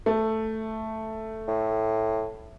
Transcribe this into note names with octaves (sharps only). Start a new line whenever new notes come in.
A3
A2